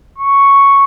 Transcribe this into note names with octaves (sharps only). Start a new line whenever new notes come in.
C#6